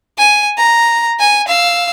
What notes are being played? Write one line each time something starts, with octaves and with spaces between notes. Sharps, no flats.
G#5
A#5
G#5
F5 E6